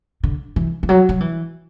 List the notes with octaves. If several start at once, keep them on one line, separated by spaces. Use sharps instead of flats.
D3
E3
E3
F#3
F#3
E3